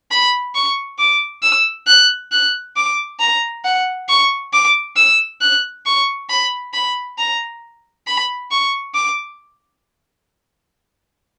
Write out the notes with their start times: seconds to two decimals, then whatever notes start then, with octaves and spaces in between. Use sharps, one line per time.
0.11 B5
0.55 C#6
0.99 D6
1.43 E6
1.87 F#6
2.32 F#6
2.76 D6
3.19 A#5
3.65 F#5
4.09 C#6
4.53 D6
4.96 E6
5.41 F#6
5.86 C#6
6.29 B5
6.73 B5
7.18 A#5
8.07 B5
8.51 C#6
8.94 D6